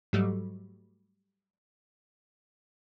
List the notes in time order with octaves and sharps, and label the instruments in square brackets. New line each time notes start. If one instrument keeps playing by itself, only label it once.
[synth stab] G#2 F#3 G3 A3